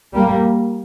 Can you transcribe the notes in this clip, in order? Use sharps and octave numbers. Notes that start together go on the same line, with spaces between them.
G3 A#3